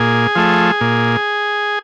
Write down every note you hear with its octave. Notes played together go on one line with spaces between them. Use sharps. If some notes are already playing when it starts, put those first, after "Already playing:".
Already playing: A#2 G#4
F3 A3
A#2